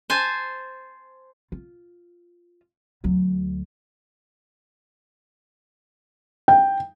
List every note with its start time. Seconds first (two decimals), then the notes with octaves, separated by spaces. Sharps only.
0.10 C5 G#5 A5
1.52 F4
3.04 D2 F#3
6.48 G5